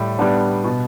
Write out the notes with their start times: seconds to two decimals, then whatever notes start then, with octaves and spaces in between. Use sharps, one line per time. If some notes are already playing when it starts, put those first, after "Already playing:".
Already playing: A2 G3
0.19 G3 B3 D4
0.64 B2